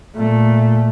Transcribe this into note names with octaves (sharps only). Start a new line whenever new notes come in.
A#2 A3